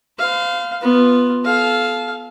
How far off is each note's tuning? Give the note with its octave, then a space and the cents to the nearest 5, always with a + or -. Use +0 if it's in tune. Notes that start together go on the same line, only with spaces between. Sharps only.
C5 -40 F5 +0
B3 +0 F4 +0
A4 -30 F5 +0